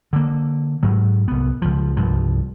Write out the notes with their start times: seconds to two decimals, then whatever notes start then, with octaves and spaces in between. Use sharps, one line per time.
0.13 D3 A#3
0.83 G#2 F#3
1.28 C2 B3
1.62 C#2 F3
1.97 C2 G2 F3